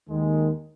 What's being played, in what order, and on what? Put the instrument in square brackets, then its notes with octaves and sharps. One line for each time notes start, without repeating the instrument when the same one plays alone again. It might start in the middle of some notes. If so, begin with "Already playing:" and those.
[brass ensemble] D#2 D#3 G#3